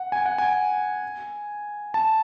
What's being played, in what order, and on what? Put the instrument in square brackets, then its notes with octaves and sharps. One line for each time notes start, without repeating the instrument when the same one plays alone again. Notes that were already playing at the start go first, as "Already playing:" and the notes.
Already playing: [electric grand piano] F#5
G#5
F#5
G#5
A5